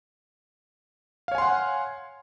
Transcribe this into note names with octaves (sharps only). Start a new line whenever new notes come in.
C#5 F5 F#5 G#5 C6